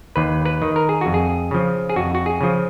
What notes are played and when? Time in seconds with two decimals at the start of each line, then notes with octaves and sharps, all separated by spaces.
0.16 D#2 B4
0.46 B4
0.62 D#3
0.76 A#4
0.89 G#4
1.01 F2 F#4
1.14 G#4
1.51 C#3 F3
1.89 G#4
1.96 F2 F#4
2.15 F#4
2.26 G#4
2.41 C#3 F3